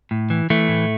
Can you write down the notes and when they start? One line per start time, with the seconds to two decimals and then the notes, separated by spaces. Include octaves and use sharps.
0.11 A2
0.30 E3
0.50 E3 A3
0.68 A2